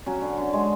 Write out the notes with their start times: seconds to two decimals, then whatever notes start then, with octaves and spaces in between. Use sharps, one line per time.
0.06 F#3 C#4
0.22 D3
0.37 D3
0.53 G#3